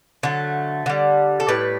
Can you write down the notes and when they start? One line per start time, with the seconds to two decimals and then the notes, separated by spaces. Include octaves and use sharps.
0.23 D3 F#3 A3
0.86 D3 G3
1.40 A4
1.48 A2 G3 B4